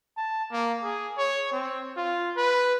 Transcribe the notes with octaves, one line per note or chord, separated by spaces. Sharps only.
A5
A#3
G#4
C#5
C4
F4
B4